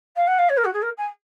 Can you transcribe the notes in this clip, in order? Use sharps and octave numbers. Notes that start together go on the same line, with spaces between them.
F5
F#5
F5
C#5
A#4
F#4
G#4
A#4
G#5